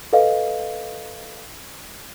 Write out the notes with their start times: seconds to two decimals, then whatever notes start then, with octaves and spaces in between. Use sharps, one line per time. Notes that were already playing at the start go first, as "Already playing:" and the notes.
0.13 A4 B4 D#5 F5